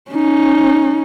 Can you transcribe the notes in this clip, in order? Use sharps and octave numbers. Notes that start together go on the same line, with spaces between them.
C#4 D#4